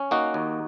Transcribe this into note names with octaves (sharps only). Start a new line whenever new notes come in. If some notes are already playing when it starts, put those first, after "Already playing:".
Already playing: C#4
A#3 D#4 F#4
D#2